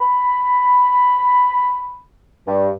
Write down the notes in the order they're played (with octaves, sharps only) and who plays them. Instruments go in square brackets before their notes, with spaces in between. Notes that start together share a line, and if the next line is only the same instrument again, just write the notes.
[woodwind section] B5
G2